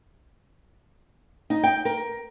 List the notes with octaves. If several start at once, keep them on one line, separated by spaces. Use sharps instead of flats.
D#4
G5
A#4